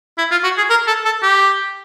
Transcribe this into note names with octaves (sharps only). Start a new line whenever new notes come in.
E4
F4
F#4
G#4
A#4
A4
A4
G4